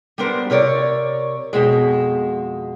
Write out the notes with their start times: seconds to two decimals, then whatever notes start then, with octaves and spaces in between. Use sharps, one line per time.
0.18 G3 B3 D4 A#4 C5
0.50 C3 A#4 C#5 D5
1.53 F2 B2 G#3